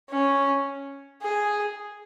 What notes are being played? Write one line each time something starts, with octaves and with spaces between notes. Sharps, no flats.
C#4
G#4